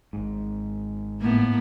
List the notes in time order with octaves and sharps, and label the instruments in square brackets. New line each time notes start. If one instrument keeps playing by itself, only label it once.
[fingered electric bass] G#1 G#2
[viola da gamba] A2 A#3 B3